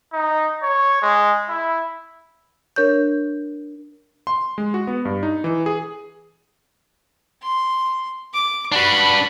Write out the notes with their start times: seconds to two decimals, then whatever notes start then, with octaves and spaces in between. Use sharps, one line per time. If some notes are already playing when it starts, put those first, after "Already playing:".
0.13 D#4
0.63 C#5
1.02 G#3
1.49 E4
2.76 D4 A#4 C#5 C#6 G6
4.27 C6
4.58 G#3
4.74 F#4
4.87 B3
5.05 G2
5.23 D#4
5.44 E3
5.66 G#4
7.43 C6
8.34 D6
8.72 D4 F#4 B4 B5